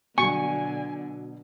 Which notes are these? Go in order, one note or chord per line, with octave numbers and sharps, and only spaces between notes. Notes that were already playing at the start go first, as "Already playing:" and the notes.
B2 D3 F#3 G#5 C#6